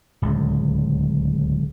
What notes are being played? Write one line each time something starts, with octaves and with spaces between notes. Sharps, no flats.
D1 C#2